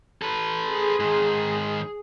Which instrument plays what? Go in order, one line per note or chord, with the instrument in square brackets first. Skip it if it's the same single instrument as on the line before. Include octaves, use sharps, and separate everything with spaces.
[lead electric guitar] A4 B4
[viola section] G#4
[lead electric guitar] G#2 D#3